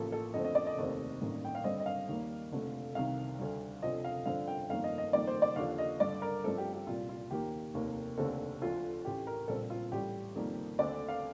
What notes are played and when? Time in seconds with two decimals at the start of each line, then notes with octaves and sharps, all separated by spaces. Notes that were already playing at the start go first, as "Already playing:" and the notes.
Already playing: A1 A2 F3 A#3 A4
0.12 A4
0.34 F2 D3 A3 C4 D#5
0.45 D#5
0.55 D5
0.66 D#5
0.78 F1 D#2 D#3 A3 C4
1.21 A1 G2 D#3 A#3
1.45 G5
1.55 F5
1.64 G2 D3 G3 C4 D#5
1.80 D#5
1.86 F5
2.08 D#2 D#3 G3 A#3
2.52 F1 F2 D3 A3
2.95 C2 C3 D#3 F5
3.39 D2 D3 G3
3.82 F1 F2 D3 F3 C4 D#5
4.04 F5
4.26 G2 D3 F3 C4 F5
4.48 G5
4.70 G1 F2 D#3 G3 A#3 F5
4.84 D#5
4.98 D#5
5.13 F2 D#3 G3 A#3 D5
5.27 C5
5.42 D5
5.56 D#2 D3 F3 F5
5.78 D#5
6.00 G2 D3 G3 D5
6.22 A#4
6.44 G2 F3 A3 C4 A4
6.58 G4
6.73 G4
6.87 C2 A#2 G3 F4
7.09 F4
7.30 D#2 D#3 A#3 G4
7.74 F1 D#2 D#3 A#3
8.18 F1 D#2 D3 A3 C4 A4
8.61 D2 D3 F3 F4
9.05 A1 A2 A3 G4
9.27 A#4
9.48 A#1 A#2 G3 C4 A4
9.70 F4
9.92 A1 A2 G3 G4
10.35 F2 D#3 G3 A#3
10.79 D2 D3 A3 C4 D5
11.08 F5